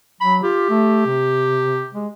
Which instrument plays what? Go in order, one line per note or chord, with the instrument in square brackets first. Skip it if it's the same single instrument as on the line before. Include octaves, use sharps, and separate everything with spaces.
[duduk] F#3 [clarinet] B5
[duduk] F4 [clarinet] G4
[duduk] A3
C3
G#3